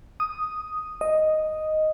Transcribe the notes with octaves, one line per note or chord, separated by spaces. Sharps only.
D#6
D#5